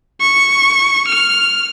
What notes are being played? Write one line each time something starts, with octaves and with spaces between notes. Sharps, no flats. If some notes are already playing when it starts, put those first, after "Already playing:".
C#6
F6